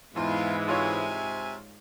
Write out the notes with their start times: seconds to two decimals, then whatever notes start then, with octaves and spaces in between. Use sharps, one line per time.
0.16 E2 G#2 E3 G#3 E4 F4
0.68 C3 F4 C#5 E5 G#5